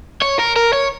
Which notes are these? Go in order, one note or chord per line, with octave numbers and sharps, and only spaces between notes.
C#5
A#4
A#4
C#5